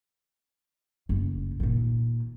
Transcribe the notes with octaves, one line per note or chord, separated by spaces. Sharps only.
F#1
A#2 D#3